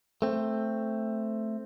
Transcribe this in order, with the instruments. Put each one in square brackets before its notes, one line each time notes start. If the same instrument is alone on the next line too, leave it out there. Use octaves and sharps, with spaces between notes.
[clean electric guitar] A3 C4